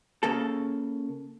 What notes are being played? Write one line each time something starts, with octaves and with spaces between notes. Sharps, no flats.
C#3 A#3 A4